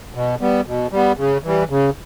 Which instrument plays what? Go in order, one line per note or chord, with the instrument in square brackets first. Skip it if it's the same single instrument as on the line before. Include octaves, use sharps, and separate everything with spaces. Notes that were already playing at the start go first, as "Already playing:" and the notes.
[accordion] B2
G3 B3
B2
G3 B3
C#3
E3 G3
C#3